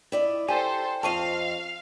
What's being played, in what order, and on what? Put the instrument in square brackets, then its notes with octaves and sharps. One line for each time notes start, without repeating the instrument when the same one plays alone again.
[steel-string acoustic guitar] E4 D5 D#5
[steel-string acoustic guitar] G4 [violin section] A4 C5 [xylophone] G#5
[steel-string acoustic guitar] F2 C4 D#5 [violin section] F5 [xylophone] A5 C#6 D#7